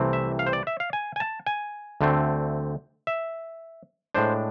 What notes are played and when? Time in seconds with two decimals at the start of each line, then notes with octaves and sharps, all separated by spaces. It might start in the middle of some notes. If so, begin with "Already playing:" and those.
Already playing: C2 C3 E3 A3 C4
0.13 E5
0.39 F5
0.47 C5
0.53 D5
0.67 E5
0.80 F5
0.93 G#5
1.16 G#5
1.20 A5
1.46 G#5
2.01 D2 D3 A3 C4
3.07 E5
4.15 A2 G#3 D4 C5